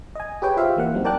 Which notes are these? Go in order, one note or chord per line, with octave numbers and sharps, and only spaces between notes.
D#5 G#5
G4 G#4 B4 C#5 G5
F4 G4 C5 E5 F5
E3 A#3 F#5
F#3 G3 C4 D#4
A#4 D5 G5 A5 D6 F#6